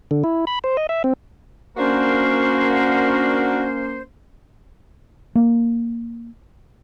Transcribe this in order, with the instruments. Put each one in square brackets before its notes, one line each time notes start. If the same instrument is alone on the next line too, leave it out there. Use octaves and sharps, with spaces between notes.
[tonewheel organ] D3
E4
B5
C5
D#5
E5
C4
[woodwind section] A#3 C#4 C5 [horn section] D4 F#4 A#4
[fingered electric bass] A#3